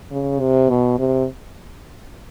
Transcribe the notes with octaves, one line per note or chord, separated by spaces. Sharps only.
C#3
C3
B2
C3